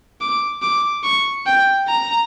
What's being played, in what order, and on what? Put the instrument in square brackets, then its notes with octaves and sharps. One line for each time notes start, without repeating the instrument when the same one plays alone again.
[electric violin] D6
D6
C#6
G5
A#5